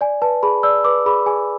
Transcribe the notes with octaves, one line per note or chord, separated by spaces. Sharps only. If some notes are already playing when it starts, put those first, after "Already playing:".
D5 G#5
B4 A5
G#4 B5
D5 E6
B4 D6
G#4 B5
G#4 G#5